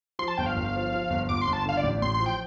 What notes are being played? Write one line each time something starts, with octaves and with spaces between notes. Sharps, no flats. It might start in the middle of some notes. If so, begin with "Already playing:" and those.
F3 C6
A5
G1 G5
F5
G1
F3
F3
G1
G1 D6
C6
G1
A5
D3 F5
D5
A1
A1 C6
C6
F3
G5